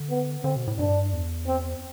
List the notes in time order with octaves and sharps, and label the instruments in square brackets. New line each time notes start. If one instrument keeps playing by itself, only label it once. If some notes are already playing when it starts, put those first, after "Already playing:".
Already playing: [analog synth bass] D3
[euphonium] B3
[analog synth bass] D3 [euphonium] C4
[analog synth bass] B2
A2
[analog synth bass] G2 [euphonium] D4
[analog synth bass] E2
[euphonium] C4